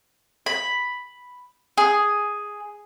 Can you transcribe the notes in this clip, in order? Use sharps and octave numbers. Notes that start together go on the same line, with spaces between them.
B5
G#4